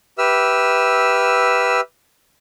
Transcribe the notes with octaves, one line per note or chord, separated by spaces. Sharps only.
G4 B4 E5 E6 F6